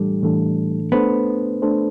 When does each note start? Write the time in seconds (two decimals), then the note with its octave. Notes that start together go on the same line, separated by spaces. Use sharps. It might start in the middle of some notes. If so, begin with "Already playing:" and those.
Already playing: A2 E3 G3 A3 D4 A4
0.22 A2 E3 A3 D4 A4
0.92 A3 B3 D4 A4 C5
1.62 A3 D4 A4 C5